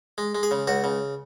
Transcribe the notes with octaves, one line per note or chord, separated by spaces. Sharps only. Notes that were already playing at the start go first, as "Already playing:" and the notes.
G#3
G#3
G#4
C#3
C#2 F#4
C#3